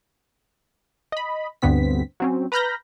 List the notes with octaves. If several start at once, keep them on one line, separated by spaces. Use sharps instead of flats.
D#5 B5
D2 G2 D3 B3 C4 B6
F#3 C4 C#4
B4 A#5 B5 F6 G6 A#6